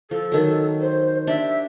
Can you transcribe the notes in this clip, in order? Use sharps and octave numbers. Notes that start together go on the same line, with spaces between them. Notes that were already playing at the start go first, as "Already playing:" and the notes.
F3 A4
D#3 F#3 A4
C5
D4 G4 E5